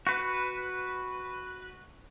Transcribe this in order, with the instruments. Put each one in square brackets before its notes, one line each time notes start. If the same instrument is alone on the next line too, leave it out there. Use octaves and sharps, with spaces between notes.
[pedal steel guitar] F#4 B4